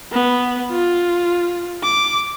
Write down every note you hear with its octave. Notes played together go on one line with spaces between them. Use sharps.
B3
F4
D6